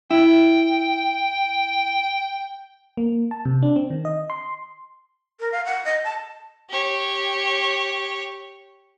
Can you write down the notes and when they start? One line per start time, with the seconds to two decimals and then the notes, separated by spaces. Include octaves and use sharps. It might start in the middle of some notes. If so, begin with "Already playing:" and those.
0.11 E4 G5
2.97 A#3
3.31 A5
3.45 C3
3.63 D4
3.76 C4
3.90 D#3
4.05 D#5
4.30 C6
5.40 A#4
5.52 F5
5.65 F#5
5.85 D#5
6.04 A5
6.70 G4 C#5